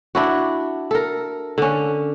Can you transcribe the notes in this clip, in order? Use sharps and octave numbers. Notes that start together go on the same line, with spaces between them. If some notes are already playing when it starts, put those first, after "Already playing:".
D4 E4 F#4
A4 A#4
D3 C#4